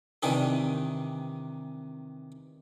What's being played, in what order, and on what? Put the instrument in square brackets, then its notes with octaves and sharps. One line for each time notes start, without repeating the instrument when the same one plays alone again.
[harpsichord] C3 D#3 E3 D4 D#4 G4